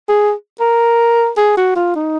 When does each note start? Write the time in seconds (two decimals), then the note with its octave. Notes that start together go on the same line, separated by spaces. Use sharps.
0.09 G#4
0.60 A#4
1.37 G#4
1.57 F#4
1.76 F4
1.96 D#4